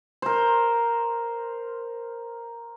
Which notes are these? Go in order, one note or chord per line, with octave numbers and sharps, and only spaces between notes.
A#4 C5